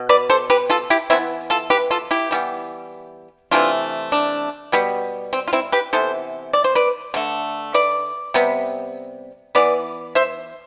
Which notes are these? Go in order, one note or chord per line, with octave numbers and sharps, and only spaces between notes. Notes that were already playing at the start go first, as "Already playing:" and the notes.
Already playing: B2
B4 D5
A4 C5
G4 B4
F4 A4
E4 G4
E3 B3 C4 E4
F4 A4
G4 B4
F4 A4
E4 G4
E3 G3 B3
C3 E3 A3 D4 F4
D4
B2 G3 B3
C4
F4
C4 E4
G4 B4
C3 E3 B3 A4 C5
D5
C5
B4 D5
D3 A3
B4 D5
C3 G3 B3
E3 B3 B4 D5
C5 E5